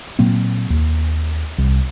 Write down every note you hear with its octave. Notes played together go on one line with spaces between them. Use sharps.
A#2 F#3 A#3 C4
D#2
C2